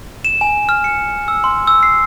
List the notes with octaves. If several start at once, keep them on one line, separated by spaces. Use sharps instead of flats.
E7
G#5
F6
C#7
E6
C6
E6
C7